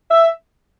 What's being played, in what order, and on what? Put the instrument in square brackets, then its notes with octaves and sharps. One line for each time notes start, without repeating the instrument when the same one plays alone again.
[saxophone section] E5